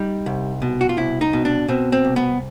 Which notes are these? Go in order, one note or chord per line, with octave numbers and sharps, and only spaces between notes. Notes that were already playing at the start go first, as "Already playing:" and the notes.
Already playing: G3 D#4
C2
B2
F#4
F4
C2 E4
D#4
B2
D4
B2 C4
C4
C2
B3